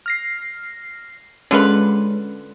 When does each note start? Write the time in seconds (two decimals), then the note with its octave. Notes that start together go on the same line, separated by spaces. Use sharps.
0.06 F6 A#6 C7
1.51 D3 G#3 C#4 F4 B4